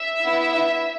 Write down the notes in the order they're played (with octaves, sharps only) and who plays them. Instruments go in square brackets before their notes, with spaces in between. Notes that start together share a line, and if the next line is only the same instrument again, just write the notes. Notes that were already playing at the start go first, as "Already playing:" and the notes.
Already playing: [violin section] E5
B3 E4